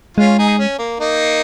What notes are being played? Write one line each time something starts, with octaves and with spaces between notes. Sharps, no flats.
G#3 C#4 F4
D#4 G#4
C#4
A#3
A#3 D#4